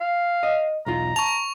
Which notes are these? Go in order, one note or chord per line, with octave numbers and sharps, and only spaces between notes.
F5
D#5
B1 E2 F4 A#5
A5 C#6 F7